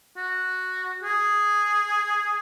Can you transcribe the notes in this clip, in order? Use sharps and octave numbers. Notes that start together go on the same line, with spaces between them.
F#4
G#4